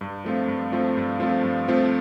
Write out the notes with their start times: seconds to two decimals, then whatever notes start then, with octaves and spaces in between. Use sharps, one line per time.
0.01 G2
0.24 F3 A3 C4 F4
0.48 G2
0.72 F3 A3 C4 F4
0.97 G2
1.20 F3 A3 C4 F4
1.44 G2
1.68 F3 A3 C4 F4